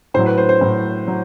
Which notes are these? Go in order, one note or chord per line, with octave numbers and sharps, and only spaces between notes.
A2 F#3 C5
B4
C5
C5
A2 F#3
F#3